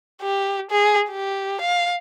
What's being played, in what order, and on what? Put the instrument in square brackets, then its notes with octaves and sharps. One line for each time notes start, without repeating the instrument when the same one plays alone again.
[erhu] G4
G#4
G4
F5